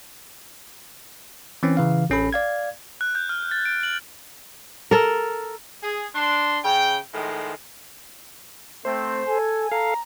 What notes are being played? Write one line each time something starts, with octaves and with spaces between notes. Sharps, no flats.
E3 C4 C#4
C#3 E3 F5
A1 C#4 A4 B5
D5 F5 G#6
F#6
G6
F6
A6
D7
F#7
A4 A#4
G#4
D4 C6
C#3 G5
A2 D#3 F3 G#3
A3 C4 C5
A4 G#5
A4 F5 A#5